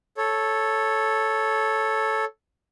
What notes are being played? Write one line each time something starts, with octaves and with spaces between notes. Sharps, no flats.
A4 C#5